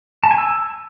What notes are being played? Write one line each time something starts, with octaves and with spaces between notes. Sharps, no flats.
A5
G#5
E6